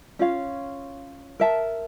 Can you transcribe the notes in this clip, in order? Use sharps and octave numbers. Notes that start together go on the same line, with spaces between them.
C#4 F4 C#5 F5
A#4 E5 A5